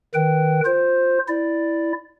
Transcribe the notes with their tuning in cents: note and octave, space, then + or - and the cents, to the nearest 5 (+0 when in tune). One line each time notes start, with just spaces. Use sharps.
D#3 +0 B4 +0 G5 -20
F4 +15 C5 +0
E4 +0 D5 +0